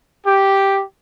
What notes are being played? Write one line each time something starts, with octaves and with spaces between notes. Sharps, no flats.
G4